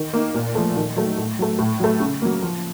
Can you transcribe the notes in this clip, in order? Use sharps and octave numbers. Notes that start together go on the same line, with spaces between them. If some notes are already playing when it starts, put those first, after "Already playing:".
Already playing: D#3
A#3 D#4
A#2
F3 A3
D#3
F#3 A3
A2
F#3 A3
A2
F#3 A3
C#3
F#3 A#3
F3